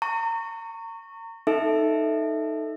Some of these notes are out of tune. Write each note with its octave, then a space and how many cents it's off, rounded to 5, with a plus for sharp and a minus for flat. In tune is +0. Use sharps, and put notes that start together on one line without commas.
A#5 -35 C#6 +0
D#4 +0 A4 +0 E5 +0